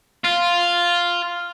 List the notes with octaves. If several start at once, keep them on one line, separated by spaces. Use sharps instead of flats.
F4